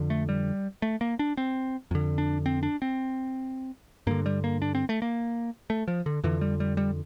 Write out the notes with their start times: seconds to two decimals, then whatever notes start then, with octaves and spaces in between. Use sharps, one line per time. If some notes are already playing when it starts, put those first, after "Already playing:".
Already playing: F2 D3
0.10 A3
0.29 G3
0.82 A3
1.01 A#3
1.19 D4
1.37 C4
1.91 F2 D3
2.18 D4
2.46 C4
2.63 D4
2.82 C4
4.07 G2 D3 A#3
4.26 G3
4.44 A#3
4.62 D4
4.75 C4
4.89 A3
5.02 A#3
5.70 A3
5.88 F3
6.06 D3
6.24 F2 D3 E3
6.41 G3
6.60 G3
6.77 G3